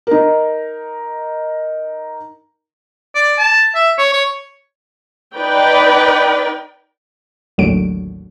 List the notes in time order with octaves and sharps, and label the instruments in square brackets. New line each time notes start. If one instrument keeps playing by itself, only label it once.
[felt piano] D#4 A#4
[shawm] D5
A5
E5
C#5
C#5
[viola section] D#4 B4 D5 G5
[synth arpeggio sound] A1 D#2 D3 F#3 D7